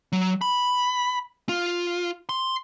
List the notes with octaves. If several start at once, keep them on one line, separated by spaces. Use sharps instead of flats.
F#3
B5
F4
C6